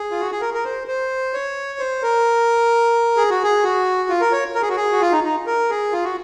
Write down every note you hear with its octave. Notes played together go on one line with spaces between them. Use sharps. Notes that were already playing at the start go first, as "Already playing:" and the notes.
Already playing: G#4
F4
F#4
G#4
A#4
A#4
C5
C5
C#5
C5
A#4
G#4
F#4
G#4
F#4
F4
A#4
C#5
A#4
G#4
F#4
G#4
F#4
F4
D#4
D#4
A#4
G#4
F4
F#4